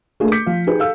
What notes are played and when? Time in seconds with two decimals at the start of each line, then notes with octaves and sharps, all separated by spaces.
0.20 A3 A#3 D4 G#4 A4
0.32 D6 G6 B6 C#7
0.46 F3 F5
0.67 D#4 G4 G#4 B4
0.79 A4 F5 E6